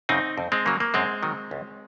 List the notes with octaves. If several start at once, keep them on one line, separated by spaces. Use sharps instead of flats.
F#2 C#3 C4 D#4
F2
G#3 C4
C#3 F#3 A#3
A#3
F#2 G#3 C4
D#3 F#3
C#2